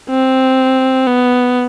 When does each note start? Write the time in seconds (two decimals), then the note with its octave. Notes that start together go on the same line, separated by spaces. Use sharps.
0.10 C4
1.07 B3